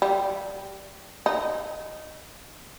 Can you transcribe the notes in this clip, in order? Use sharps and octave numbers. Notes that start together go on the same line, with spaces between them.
G3
D#4